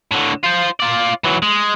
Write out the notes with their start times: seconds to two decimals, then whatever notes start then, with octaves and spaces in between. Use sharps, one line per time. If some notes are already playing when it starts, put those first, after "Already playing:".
0.11 A2 D3
0.43 F4 C5
0.80 F4 D5
1.24 E3 F#3
1.42 G#3